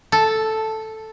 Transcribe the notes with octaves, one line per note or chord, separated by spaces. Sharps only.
A4